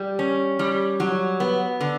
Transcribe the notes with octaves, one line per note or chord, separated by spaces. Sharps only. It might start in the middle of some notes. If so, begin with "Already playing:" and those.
Already playing: G3
C#4
G3
F#3
B3
D3